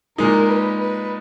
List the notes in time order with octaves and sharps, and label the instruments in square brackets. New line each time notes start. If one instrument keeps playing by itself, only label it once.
[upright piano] A#2 G#3 D#4 [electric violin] A#4
[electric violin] B4
B4